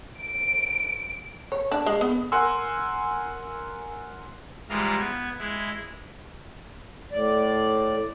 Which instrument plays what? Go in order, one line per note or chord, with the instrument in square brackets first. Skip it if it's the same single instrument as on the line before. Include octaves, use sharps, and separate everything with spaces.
[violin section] D7
[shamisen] C#5
D4
G#3
B3
[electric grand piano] A#4 F#5 G#5 C6 E6
[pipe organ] G#2 E3 G3 G#3 F4 A#5
B3 G#6
G#3 E4
[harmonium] A2 D5